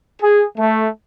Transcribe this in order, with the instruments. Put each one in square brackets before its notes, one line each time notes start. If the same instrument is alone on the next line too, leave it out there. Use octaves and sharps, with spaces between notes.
[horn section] G#4
A3